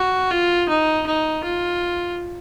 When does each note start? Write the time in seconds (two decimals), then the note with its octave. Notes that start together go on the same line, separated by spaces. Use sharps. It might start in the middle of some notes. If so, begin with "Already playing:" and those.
Already playing: F#4
0.31 F4
0.69 D#4
1.06 D#4
1.43 F4